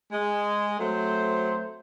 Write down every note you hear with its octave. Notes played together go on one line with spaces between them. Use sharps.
G#3
F#3 A3 C4 C5